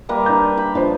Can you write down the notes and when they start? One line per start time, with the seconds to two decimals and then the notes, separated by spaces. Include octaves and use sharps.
0.09 G3 A#3 B4
0.26 D4 A#5 G6
0.57 B5
0.75 F3 D4 B4 C5